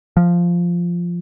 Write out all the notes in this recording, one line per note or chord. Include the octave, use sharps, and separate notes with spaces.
F3